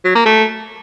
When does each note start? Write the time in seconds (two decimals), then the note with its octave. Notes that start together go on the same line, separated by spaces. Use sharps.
0.05 F#3
0.15 A#3
0.25 A3